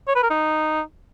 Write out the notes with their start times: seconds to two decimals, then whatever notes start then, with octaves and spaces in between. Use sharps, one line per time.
0.08 C#5
0.15 B4
0.23 A#4
0.30 D#4